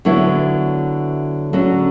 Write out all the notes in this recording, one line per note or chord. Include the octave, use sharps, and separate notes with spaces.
D3 F#3 B3 E4
D3 F#3 C#4 F#4